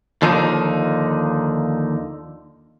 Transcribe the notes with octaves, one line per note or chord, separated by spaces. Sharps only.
D#2 D3 F3 D#4